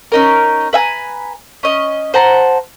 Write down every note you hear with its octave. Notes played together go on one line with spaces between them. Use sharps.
C#4 D#4 A#4
B4 E5 G#5 A#5
C#4 D#5
C5 F#5 A5 A#5